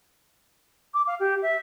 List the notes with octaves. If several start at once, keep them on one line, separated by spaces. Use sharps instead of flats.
D6
F5
G4
E5